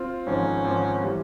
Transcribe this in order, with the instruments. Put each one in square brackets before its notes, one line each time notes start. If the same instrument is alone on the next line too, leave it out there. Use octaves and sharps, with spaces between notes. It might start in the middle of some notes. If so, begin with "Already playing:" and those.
Already playing: [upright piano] C4 F4
[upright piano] G#1 G#2 F3 C4 [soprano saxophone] C#4
[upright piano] G#1 G#2 F3 C4
E3 G3